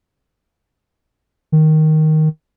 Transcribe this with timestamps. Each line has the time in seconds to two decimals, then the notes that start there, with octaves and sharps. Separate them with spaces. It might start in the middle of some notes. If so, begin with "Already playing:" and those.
1.52 D#3